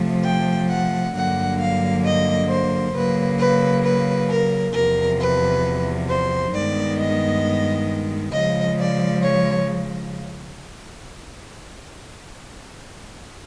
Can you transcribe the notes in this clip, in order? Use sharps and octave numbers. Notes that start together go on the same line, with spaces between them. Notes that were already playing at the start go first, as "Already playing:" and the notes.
Already playing: C3 F3 A3
G5
F#5
G2 D3 F#3 A#3 F#5
F5
D#5
C5
C#3 F#3 A#3 B4
B4
B4
A#4
E2 C3 F3 A#4
B4
C5
G2 D#3 G#3 B3 D5
D#5
C#3 F3 G#3 D#5
D5
C#5